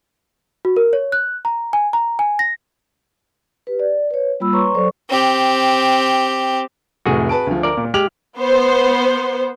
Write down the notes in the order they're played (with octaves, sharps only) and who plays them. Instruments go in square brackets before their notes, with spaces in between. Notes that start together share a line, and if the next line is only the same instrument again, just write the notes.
[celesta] F#4
A#4
C#5
F#6
A#5
G#5
A#5
G#5
A#6
[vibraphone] G4 B4
D5
B4 C#5
G3 A#3 F4 B5 E6
B4 C#5 A#5 C6 C#6
F#3 A4 C5 D5 C#6
[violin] C4 G4
[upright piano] F1 A2 E3 [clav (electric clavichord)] F#4 G#4
[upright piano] B4 A5 D7
D2 F3
[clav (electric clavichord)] A#4 D5
[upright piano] A#2
[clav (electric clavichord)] G#3 G4 [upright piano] F6 F7 F#7
[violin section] B3 C5